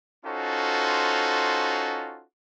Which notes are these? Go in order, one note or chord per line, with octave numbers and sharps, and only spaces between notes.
C#4 D#4 F4 F#4 A4 C5